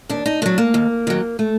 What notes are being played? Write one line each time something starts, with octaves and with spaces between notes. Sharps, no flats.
D#2 D4
D#4
D#3 F#3 D4
A#3
D#2
D#3 F#3
A3